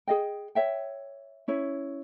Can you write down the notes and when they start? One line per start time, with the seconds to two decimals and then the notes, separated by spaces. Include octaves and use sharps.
0.08 G#4 D#5 G5
0.55 C#5 E5 G5
1.48 C#4 E4 C#5